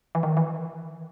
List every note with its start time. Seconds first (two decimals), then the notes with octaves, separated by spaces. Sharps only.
0.15 E3
0.23 D#3
0.37 E3